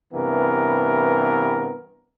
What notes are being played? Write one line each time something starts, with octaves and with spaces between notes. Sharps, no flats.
G2 C3 E3 B3 A#4